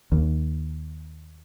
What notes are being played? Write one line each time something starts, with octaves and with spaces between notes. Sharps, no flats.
D#2